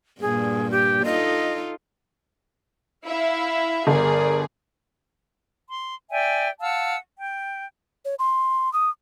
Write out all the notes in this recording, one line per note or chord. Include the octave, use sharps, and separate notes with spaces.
G2 A#2 G#4
G4
D#4 F4 A4 D#5
E4 E5 F5
G1 G#4 A#4 D5
C6
D5 E5 G5 G#5
F5 F#5 A5 E6
G5
C#5
C6
D#6